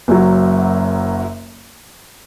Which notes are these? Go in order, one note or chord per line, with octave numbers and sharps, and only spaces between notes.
F#1 F#2 F#3